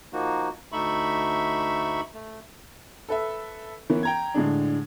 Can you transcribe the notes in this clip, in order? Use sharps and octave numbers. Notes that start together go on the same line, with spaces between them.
F3 A#3 D#4 F#4
D2 A3 D#4 E5 B5 C#6
A3
A4 B4 E5
E3 A#3 B3 C#4
G5 A#5 G#6
A2 D3 G#3 D4